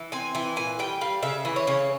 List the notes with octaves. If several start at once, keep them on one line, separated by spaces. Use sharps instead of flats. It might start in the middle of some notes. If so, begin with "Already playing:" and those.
Already playing: E3
C4 G#5
E3 G#5
A#2 G#5
G3 G5
G3 F5
C#3 E5
E3
C#5
C#3